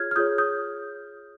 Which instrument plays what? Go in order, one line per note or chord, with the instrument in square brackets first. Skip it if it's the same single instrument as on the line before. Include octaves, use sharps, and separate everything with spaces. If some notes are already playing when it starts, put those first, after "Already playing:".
Already playing: [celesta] F4 G#4 C#5 F6 G#6
F6
F4 G#4 C#5 D#6 G6
D#6 G6